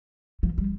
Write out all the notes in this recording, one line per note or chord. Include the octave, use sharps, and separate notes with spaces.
F3
G3